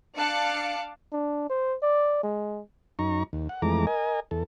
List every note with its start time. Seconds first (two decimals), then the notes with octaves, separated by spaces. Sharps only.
0.17 D4 F5 A5 D6 F#6 C#7
1.12 D4
1.50 C5
1.82 D5
2.23 G#3
2.99 F#2 D#4 A#5 C#6
3.33 D#2
3.49 F#5
3.62 F2 E3 G#3 A3 A#5 D6
3.87 A#4 D#5 G#5
4.31 E2 A4